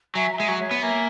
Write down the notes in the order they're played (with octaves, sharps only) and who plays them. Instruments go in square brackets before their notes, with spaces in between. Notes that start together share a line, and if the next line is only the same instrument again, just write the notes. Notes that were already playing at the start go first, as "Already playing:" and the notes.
[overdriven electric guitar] F#3 [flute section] E5 G#5
[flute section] A#5
[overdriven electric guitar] G#3 [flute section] E5 G#5
[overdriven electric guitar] F#3
[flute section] C#5 E5
[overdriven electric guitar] B3
[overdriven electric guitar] A#3 [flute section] E5 G#5